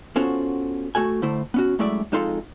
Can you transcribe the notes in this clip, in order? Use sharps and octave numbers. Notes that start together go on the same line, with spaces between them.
B3 C#4 F4 F#4 A4 C5
A3 F#4 A4 G#5
D3 A3 E4 C5
B3 C#4 F#4
F#2 G#3 A3 E4 D5 E5
F2 G#3 D#4 F4 A4 C6